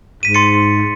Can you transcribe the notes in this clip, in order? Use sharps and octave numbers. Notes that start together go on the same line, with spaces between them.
G#2 B6 D#7
C6 A6 C#7